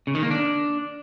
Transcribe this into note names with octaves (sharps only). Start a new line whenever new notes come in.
C#3
D#3
A#3
D4